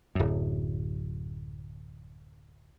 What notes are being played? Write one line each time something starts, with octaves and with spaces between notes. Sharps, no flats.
D1 F#2